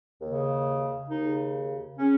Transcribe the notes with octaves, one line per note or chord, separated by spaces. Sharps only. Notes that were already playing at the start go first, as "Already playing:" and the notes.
D#2 C#3
D#2 C#3 D#4
C#3 C#4